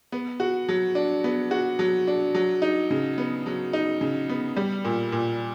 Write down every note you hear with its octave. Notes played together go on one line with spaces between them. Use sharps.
B3
F#4
F#3
D4
B3
F#4
F#3
D4
F#3
D#4
C#3
B3
F#3
D#4
C#3
B3
G3
A#2
A#2